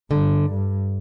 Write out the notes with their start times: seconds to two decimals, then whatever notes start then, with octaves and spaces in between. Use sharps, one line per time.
0.10 G2 D3
0.48 G2